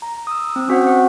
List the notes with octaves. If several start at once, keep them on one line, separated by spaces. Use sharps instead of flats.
A#5
D#6 E6
C4 E6
C4 C#4 F#4 C5 F#5
C4 F#5